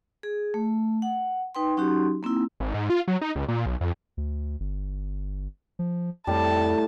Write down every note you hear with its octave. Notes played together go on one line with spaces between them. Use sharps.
G#4
A3
F#5
D#4 B4 G5 C6
F#3 C#4 D#4 F#4 G4 C6
A#3 C4 D#4 E4
G#1
G#2
F4
F#3
D#4
C#2
A#2
B1
F2
D2
G1
F3
F2 A2 G3 A5